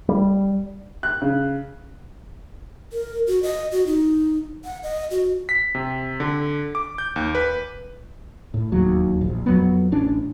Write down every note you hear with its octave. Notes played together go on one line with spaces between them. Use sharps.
G3
F#6
C#3
A#4
F#4
D#5
F#4
D#4
F#5
D#5
F#4
B6
C3
D3
D6
G6
D#2
B4
A2
E1 D#2 F#3
E1 A#1
F2 F#3 B3
A1 C#4 D4